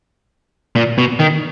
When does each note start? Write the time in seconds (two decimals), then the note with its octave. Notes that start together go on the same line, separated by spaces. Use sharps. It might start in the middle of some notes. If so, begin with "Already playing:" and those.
0.76 A#2
0.98 B2
1.20 D#3